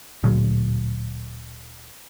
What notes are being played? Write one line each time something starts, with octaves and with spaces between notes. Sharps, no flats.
D1 D2 A#2 F#3